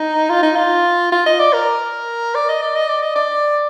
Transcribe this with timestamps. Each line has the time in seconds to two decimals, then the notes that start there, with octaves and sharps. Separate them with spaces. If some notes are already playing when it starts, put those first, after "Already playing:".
Already playing: D#4
0.30 F4
0.43 D#4
0.56 F4
1.12 F4
1.26 D#5
1.39 D5
1.53 A#4
2.35 D5
2.49 D#5
2.62 D5
2.75 D#5
2.89 D5
3.02 D#5
3.15 D5